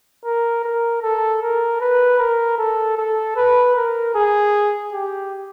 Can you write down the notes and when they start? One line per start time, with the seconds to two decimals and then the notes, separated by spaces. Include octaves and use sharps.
0.25 A#4
0.64 A#4
1.03 A4
1.42 A#4
1.80 B4
2.19 A#4
2.58 A4
2.98 A4
3.37 B4
3.76 A#4
4.15 G#4
4.92 G4